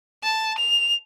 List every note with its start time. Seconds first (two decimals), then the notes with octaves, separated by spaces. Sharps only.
0.23 A5
0.59 F7